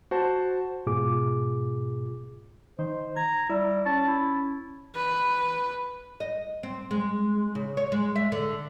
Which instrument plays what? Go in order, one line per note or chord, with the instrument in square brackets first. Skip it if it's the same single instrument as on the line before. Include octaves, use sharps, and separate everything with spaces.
[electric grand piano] F#4 C5 A5
[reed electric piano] G#2 B2 F4 G#4 D6
[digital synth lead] D#3 [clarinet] C5
[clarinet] A#5 [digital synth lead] G#6
[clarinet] G3 [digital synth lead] E4
[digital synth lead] C#4 [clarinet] A5
[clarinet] E4
[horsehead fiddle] B4
[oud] D#5
C4
G#3
C#3
C#5
G#3
E5
D3